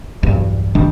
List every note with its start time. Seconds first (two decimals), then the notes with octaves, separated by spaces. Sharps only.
0.23 B1 E2 G2
0.75 G1 D#3 G3 D4